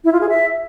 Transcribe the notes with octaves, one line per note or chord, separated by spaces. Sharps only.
E4
F4
G#4
E5